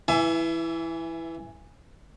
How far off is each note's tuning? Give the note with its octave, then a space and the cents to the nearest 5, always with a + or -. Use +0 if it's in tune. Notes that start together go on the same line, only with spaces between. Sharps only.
E3 +0 E5 +25 G#5 +40